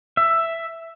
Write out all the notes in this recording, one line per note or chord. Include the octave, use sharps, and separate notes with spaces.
E5